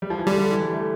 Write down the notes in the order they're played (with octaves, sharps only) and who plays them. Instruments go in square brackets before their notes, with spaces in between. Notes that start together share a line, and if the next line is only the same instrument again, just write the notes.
[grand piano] G3
F3
E3
[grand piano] D3 [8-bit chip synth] G3
[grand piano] D3
E3
G3
A3